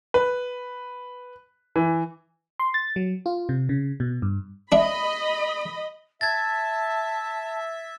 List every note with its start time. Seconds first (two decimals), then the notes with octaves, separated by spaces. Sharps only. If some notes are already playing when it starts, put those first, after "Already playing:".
0.14 B4
1.76 E3
2.59 C6
2.74 A6
2.96 F#3
3.26 F4
3.49 C3
3.69 C#3
4.00 B2
4.22 G2
4.72 D4 D#5 E5 B5
6.21 E5 A5 G#6 A6